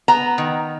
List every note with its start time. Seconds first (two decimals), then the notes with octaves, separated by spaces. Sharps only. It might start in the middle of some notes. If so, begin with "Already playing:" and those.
0.08 B3 A#5
0.38 D#3